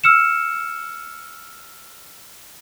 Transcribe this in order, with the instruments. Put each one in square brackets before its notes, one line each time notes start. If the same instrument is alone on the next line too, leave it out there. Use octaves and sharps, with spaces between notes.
[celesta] E6 F6 C#7 E7